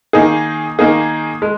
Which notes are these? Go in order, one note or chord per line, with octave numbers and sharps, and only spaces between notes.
D#3 A#3 D#4 G#4
D#3 A#3 D#4 G#4
G#3